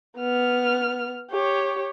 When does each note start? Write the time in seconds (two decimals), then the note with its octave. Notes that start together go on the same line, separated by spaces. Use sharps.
0.18 B3 F6
1.31 G4 C#5